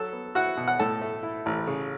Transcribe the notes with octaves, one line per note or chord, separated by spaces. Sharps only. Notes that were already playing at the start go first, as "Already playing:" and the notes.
Already playing: F#3 A4 A5
B3
E4 F#4 F#5
B2
F#5
A2 A4 A5
A3
E4
A1
C#3